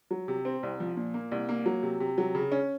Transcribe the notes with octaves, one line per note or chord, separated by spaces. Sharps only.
F#3
C3
C4
C2
F3
A#2
A#3
C2
A#3
F#3
C3
C3
F#3
C#3
C#4